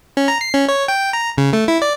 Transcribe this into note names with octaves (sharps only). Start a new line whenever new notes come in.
C#4
A#5
C7
C#4
C#5
G5
A#5
C#3
A3
E4
D5